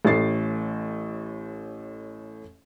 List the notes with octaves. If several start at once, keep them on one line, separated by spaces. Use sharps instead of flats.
A1 A2 A6 C7